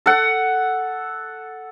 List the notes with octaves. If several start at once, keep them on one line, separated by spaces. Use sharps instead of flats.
A4 F#5